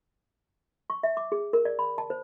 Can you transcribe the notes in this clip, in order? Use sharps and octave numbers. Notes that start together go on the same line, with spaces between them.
C#6
E5
D6
G#4
A#4
D5
B5
A5
C5